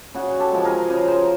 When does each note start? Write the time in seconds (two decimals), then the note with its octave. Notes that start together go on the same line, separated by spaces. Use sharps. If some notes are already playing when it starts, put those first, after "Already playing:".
0.15 C#3 F#4 G#4
0.40 G4 A4
0.52 F3 G#3
0.64 G#4 A#4
0.90 C#3
1.08 A#4 C5